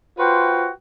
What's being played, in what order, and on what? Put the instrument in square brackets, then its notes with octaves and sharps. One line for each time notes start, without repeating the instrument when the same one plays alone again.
[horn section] F4 F#4 B4 C5 G5